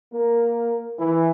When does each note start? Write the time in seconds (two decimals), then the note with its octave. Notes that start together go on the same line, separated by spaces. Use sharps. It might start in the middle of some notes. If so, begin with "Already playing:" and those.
0.12 A#3 A#4
0.99 E3